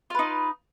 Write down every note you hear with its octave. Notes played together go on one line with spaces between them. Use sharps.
D#4 F4 B4